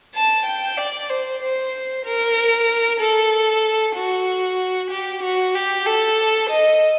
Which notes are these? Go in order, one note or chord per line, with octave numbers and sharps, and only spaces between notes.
A5
G5
D5
C5
C5
A#4
A4
F#4
G4
F#4
G4
A4
D#5